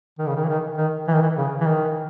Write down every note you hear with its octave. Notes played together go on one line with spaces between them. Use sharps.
D#3
C#3
D#3
E3
D#3
D#3
E3
D#3
E3
C#3
E3
D#3